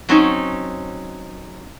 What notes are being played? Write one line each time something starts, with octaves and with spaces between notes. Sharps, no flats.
F#3 C4 C#4 D#4